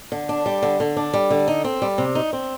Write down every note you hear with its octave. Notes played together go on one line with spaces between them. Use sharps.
D3
D4
G3
D3
D3
D4
G3
D3
D#4
C4
G3
C3
D#4
C4